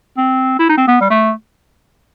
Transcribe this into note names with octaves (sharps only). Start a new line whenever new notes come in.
C4
E4
D#4
C4
B3
G3
A3